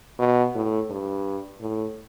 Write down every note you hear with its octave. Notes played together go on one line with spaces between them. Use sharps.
B2
A2
G2
A2